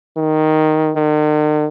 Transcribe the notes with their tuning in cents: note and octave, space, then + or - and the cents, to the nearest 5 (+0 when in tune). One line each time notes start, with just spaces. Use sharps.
D#3 +0
D#3 -45